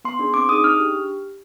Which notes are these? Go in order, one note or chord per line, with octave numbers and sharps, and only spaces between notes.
B3 C6
D4 G#4
C4 D6
D#4 G#4 D#6
D4 F6
G4